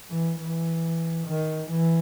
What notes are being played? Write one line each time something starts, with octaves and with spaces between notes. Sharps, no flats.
E3
E3
D#3
E3